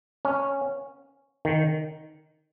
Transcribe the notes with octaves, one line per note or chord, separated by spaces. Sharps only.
C#4
D#3